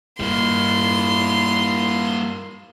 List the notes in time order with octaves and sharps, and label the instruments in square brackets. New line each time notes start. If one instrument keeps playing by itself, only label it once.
[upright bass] G2 [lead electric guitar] G3 A#3 [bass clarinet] E4 [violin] C6